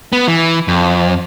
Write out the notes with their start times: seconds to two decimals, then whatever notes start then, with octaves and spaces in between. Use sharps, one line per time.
0.13 B3
0.28 E3
0.68 F2